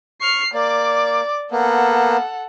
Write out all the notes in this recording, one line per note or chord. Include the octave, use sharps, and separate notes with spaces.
C#6 F6 C7
A#3 D5 D6
A#3 B3 A4 F#5